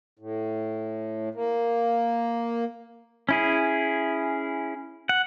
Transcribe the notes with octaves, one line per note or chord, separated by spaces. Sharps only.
A2
A#3
C#4 E4 G#4
F#5